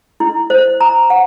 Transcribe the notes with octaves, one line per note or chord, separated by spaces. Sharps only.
E4
C5
A#5
F#5